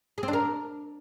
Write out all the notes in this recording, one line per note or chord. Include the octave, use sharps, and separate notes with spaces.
G#4
C4
D4
A#4